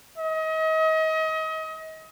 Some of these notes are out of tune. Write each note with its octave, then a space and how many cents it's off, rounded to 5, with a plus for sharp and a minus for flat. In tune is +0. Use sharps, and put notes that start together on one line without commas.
D#5 +35